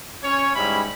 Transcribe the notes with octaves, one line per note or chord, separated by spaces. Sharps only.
C#4 C#5
G#2 G3 C#4 E4 B5